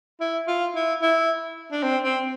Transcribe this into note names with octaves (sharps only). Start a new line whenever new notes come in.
E4
F4
E4
E4
D4
C4
C4